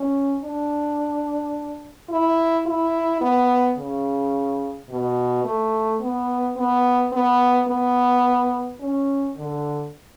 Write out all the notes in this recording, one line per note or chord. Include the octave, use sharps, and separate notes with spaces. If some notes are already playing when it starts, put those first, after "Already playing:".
Already playing: C#4
D4
E4
E4
B3
C#3
B2
A3
B3
B3
B3
B3
C#4
D3